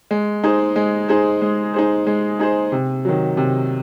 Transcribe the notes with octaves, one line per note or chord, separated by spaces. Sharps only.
G#3
D#4 G#4 C5
G#3
D#4 G#4 C5
G#3
D#4 G#4 C5
G#3
D#4 G#4 C5
C3
D#3 F#3
C3